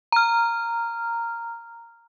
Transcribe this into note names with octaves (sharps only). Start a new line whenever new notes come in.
A#5 F6